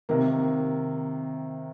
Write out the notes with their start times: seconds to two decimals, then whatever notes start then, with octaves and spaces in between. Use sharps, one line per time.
0.09 C3 D#3 A#3